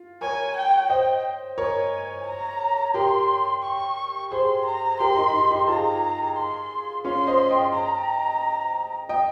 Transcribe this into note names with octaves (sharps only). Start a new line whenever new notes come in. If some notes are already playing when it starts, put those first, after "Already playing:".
Already playing: F4
A#4 C#5 G#5
G5
C5 D#5 G5
A#4 C#5 G#5
A#5
G4 A#4 C6
C#6
G#4 C5 C6
A#5
G4 A#4 C6
D#4 G4
D#4
D#4 G4
F4 G#4 A#5
C6
C#4 F4 C6
C5 D#5
D#5 G5
A#5
D#5 G5